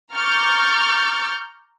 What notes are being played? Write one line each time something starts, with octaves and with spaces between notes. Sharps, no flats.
A#5 C#6 D6 F6 G6 A6